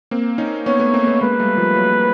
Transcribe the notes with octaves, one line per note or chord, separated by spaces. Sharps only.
A#3 C4
C#4 D#4
B3 C#4 C#5
A3 B3
A#3 C4
A3 B3
G#3 A#3 B4
G3 A3
F3 G3
F#3